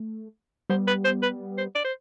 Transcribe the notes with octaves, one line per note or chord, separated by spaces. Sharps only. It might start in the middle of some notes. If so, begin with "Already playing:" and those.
Already playing: A3
G3 B3 C5
B4
C5
B4
C5
D5
C5